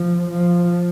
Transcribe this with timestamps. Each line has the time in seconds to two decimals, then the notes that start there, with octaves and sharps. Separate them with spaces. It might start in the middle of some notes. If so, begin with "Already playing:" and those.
Already playing: F3
0.31 F3